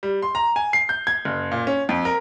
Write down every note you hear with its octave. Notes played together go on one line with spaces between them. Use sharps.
G3
C6
A#5
G#5
C7
G6
G#6
F#1
A#2
C#4
F2
A#4